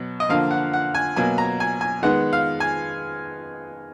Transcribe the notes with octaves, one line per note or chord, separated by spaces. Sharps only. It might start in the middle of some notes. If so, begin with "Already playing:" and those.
Already playing: B2 F#3
D#5
D3 F3 A#3 F5
F#5
F#5
G#5
B2 F#3 A#3 G#5
A#5
G#5
G#5
D#3 G#3 B3 F#5
F5
G#5